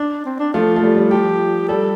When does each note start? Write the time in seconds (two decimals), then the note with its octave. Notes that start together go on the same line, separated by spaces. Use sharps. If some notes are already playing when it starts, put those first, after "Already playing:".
Already playing: D4
0.26 C4
0.39 D4
0.54 F3 A3 F4
0.76 A3
0.83 G3
0.96 G3
1.11 F3 G4
1.68 G3 A4